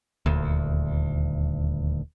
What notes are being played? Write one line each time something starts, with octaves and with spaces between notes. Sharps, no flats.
D#1 D2